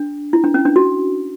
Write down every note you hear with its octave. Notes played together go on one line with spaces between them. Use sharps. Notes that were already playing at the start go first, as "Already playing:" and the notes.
Already playing: D4
E4
D4
C#4
D4
F#4